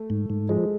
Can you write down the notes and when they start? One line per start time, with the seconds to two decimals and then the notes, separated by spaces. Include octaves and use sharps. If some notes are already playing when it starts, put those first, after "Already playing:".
Already playing: A3
0.10 G#2
0.30 G#2
0.49 F3 G#3